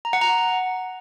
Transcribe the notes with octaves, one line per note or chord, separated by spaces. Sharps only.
A#5
F#5
A#5